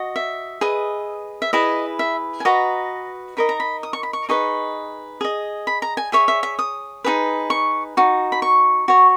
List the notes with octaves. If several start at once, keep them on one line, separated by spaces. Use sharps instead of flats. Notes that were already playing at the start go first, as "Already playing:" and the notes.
Already playing: F#4 D#5
E5
G#4 B4 D#5
E5
E4 G#4 B4 D#5
E5
G#5
F#4 B4 D#5 A#5
D#4 A#4 D#5 B5
A#5
B5
D#6
C#6
B5
C#6
D#4 G#4 B4 D#5 C#6
G#4 D#5
B5
A#5
G#5
G#4 C#5 E5
E5
E5
D#6
D#4 G#4 B4
C#6
D#4 F#4
B5
C#6
F#4 C#5